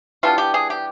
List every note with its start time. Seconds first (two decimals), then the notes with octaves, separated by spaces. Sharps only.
0.23 E3 G3 B3 D4 F4
0.38 G4
0.54 G#4
0.70 G4